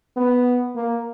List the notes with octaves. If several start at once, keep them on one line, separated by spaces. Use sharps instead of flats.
B3
A#3